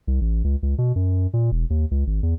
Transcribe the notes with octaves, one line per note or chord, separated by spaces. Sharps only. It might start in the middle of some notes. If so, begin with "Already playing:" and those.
C2
A1
C#2
C#2
B2
F#2
A#2
E1
D#2
C#2
G#1
E2